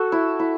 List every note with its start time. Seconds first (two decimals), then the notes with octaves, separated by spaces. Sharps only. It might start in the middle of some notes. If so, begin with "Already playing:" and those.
Already playing: F#4 A4
0.12 E4
0.40 E4